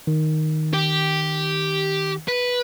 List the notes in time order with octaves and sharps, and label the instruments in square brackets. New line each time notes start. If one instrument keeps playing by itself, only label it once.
[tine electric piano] D#3
[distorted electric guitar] G4
B4